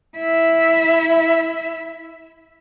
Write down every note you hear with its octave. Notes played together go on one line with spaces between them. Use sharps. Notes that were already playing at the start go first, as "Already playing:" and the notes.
E4 E5